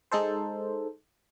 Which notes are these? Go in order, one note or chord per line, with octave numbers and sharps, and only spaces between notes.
G#3 D#4 A4 C5